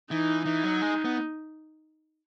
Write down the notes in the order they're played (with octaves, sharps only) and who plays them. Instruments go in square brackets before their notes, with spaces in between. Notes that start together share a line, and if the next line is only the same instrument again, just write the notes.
[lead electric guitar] E3 [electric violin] D#4
[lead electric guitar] E3 [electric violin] D#4
[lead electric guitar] F#3
G#3
B3